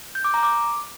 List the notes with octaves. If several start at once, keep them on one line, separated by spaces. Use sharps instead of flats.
G6
D6
A#5
D6